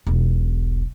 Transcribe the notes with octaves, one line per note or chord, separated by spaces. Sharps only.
E1 B1